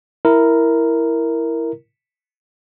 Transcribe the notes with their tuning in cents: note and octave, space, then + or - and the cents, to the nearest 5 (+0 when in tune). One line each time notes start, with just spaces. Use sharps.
E4 +0 A#4 +0